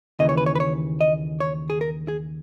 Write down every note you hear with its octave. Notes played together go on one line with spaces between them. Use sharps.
D#2 C#3 E3 D#5
C#5
B4
C#5
B4
C#5
D#5
C#5
G#4
A#4
G#4